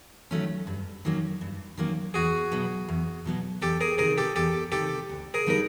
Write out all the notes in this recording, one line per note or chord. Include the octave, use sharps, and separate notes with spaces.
D#3 F#3 A3 C#4
G2
D#3 F#3 A#3 C#4
G2
D#3 F#3 A#3 C#4
E2 F#4 G#4
B2 F#3 B3
E2
B2 F#3 B3
E2 G4 A4
G#4 A#4
C3 D#3 G#4 A#4
G4 A4
E2 G4 A4
C3 D#3 G4 A4
D2
G#4 A#4
D3 G3 B3 D#4 A#4